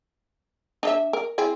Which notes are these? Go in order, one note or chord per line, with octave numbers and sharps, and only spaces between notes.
D4 D#5 E5
A#4
C4 E4 G#4